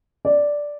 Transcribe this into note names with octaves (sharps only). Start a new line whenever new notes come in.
D5